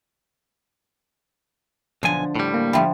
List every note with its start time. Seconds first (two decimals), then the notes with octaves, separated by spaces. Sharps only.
2.03 B1 D3 F3 G#5
2.35 A2 G3
2.54 A#3
2.73 D3 F3 E5 G5 B5